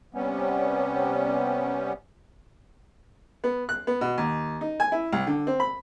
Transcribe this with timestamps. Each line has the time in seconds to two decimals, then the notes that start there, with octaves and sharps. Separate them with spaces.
0.14 C3 G3 B3 C#4
3.44 B3
3.69 F#6
3.87 B3
4.01 B2
4.18 D#2
4.61 D#4
4.80 G#5
4.92 E4
5.12 C2
5.27 D3
5.47 C4
5.60 B5